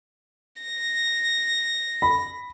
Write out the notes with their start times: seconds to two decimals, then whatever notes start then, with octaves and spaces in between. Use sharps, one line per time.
0.62 A#6
2.02 B5